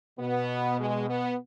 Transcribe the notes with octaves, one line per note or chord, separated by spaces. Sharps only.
B2 B3
G#3
B3